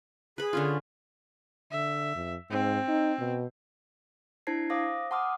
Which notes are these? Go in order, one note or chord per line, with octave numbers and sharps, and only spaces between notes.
G#4 B4 B5
D3 C#4 F4
D3 E5
F2
G#2 C4
D#4
B2
D4 E4 C5 A5 G#6 C7
C5 F5 D6 D#6 A#6
F#5 A5 C6 D6 D#6 F6